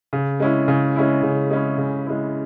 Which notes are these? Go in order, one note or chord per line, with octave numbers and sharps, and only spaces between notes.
C#3
G#3 C#4 E4
C#3
G#3 C#4 E4
C#3
G#3 C#4 E4
C#3
G#3 C#4 E4